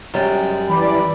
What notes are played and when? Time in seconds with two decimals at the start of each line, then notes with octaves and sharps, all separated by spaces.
0.14 F#2 G3 G#3
0.69 E3 D5 B5